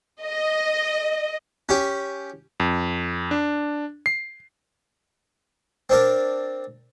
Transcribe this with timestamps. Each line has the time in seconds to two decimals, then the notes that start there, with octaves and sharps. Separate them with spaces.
0.24 D#5
1.69 C#4 G4
2.60 F2
3.31 D4
4.06 C7
5.90 C4 D4 A#4